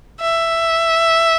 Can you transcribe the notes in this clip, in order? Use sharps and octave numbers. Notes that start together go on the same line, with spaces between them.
E5